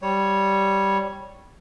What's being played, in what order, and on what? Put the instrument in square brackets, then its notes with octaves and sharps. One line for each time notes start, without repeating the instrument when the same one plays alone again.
[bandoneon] G3 C#5